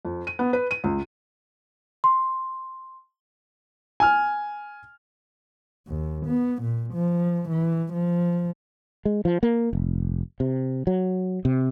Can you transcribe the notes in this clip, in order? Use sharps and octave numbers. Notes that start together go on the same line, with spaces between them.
F2
D#7
B3
B4
D#7
C#2
C6
G#5 F6
D#2
B3
A#2
F3
E3
F3
G#3
F3
A#3
F1
C3
F#3
C3